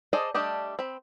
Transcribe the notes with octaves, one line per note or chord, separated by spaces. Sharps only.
G#4 A4 C5 D5 D#5
G3 A3 D4 G4 D#5
C4 B5